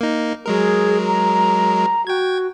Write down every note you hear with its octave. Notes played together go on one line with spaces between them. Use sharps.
A#3 D#4
F#3 G#3 G#4 A#4
A#5
F#4 G5 G#6